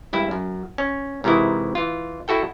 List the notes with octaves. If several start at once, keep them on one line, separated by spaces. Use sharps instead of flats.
G#1 G2 E4 E5
F#2
C#4
G#2 C3 D#3 E3 E4
E3 F4
E4 F#4 A4 G5